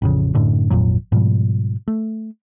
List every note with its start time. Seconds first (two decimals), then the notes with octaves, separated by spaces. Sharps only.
0.02 A1 F2 C#3
0.35 F#2 A2 D3
0.70 G#1 F2 A#2 F#3
1.12 G#2 B2 F3 G3
1.88 A3